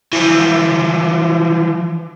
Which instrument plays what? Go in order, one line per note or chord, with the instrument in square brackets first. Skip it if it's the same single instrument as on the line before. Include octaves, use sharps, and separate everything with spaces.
[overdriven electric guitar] E3 F3